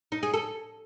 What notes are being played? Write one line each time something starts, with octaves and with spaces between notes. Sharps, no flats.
D#4
G#4
A4